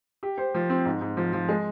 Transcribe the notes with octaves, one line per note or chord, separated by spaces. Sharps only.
G4
C5
F3
C4
G#2
G#2
F3
F3
G#3